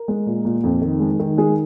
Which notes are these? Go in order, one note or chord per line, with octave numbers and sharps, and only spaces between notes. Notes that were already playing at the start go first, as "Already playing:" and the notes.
Already playing: A#4
G#3
A#2
A#2
F2
D#3
G#3
D#3
G#3 G#4